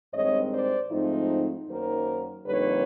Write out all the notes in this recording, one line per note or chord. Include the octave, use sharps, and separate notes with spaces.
G2 D#3 G#3 C4 C#5 D#5
C5 D5
G#2 F3 A3 C4 D#4
F#2 D#3 F#3 A#3 D#4 A#4 C5
F2 D3 G3 A#3 D#4 B4 C#5